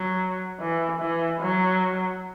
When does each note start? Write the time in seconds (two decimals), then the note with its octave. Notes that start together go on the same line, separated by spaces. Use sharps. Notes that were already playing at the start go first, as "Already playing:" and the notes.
Already playing: F#3
0.60 E3
1.00 E3
1.41 F#3